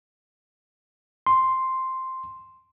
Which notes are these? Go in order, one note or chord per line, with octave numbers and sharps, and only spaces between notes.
C6